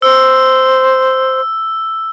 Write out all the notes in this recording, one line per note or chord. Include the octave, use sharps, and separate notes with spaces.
C5 E6